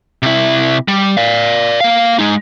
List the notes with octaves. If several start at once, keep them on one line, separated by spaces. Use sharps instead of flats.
C3 E4
G3
D5 F5
A#3 F5
G#3 D#4